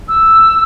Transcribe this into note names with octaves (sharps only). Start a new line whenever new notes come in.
E6